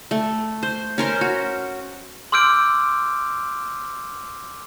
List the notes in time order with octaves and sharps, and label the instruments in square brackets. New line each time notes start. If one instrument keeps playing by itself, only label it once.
[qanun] A3
C5
C#4 A#4 C5
F#4
[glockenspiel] C6 D6 E6 F6 G6 D7